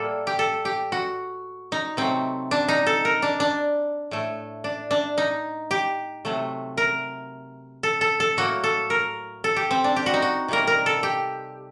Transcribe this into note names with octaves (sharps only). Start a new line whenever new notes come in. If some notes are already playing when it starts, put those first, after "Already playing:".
Already playing: A2 G3 A#3 A4
G4
A4
G4
F#4
D#4
C3 F#3 A3 C4
D4
D#4
A4
A#4
D4
D4
A2 A3
D4
D4
D#4
G4
C3 F#3 A3
A#4
A4
A4
A4
A2 F#3 A#3 F#4
A4
A#4
A4
G4
C4
D4
G4
F#4
D#4
F#4
C3 G3 A#3 A#4
A#4
A4
G4